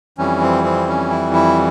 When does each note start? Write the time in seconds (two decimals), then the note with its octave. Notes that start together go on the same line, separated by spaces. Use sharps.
0.18 F2 E3 G3 C#4
0.41 C4
0.64 C4
0.88 C#4
1.10 E4
1.33 E4